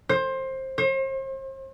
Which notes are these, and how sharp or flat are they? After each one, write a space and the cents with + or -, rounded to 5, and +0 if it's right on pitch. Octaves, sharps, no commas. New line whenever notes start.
C5 +20
C5 +40